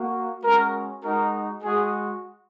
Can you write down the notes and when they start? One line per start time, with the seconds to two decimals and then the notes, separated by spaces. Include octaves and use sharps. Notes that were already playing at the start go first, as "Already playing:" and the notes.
Already playing: A#3 F#4
0.43 G#3 C#4 F#4 A#4
1.03 G#3 D#4 F#4 A#4
1.63 G#3 F#4 G#4